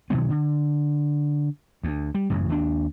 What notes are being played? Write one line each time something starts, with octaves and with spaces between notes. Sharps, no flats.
B2 D#3 F#3 B3
D3
D2
G3
A1 F#2 C#3
D#2 D4